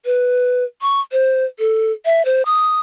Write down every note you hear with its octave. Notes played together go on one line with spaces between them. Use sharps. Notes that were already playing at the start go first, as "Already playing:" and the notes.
B4
C#6
C5
A4
E5
C5
D#6